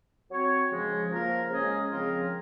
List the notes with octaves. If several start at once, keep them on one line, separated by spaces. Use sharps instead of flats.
F#3 C4 F#4 C#5
C#3 F3 G#3
F3 A#3 F4 A#4
C#3 G#3 C#4 G#4 D#5
C#3 F3 C4 F4 A#4